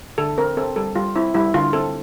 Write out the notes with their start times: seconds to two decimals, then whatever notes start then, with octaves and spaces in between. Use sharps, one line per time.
0.18 D3 A4
0.38 C4 A#4
0.57 C4 A4
0.76 G3 A4
0.96 G3 F4
1.15 C4 E4
1.34 G3 E4
1.54 D3 F4
1.73 C4 A4